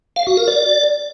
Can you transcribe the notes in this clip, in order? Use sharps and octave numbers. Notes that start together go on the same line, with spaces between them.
F5
F#4
A#4
D5